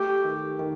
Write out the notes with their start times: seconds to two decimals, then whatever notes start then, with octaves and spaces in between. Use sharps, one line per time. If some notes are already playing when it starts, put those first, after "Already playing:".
Already playing: A3 G4
0.24 D#3
0.59 D#3